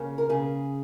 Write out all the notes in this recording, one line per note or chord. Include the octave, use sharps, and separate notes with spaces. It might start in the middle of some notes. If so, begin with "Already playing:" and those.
Already playing: C#3 A#3
A#4
C#3 G#4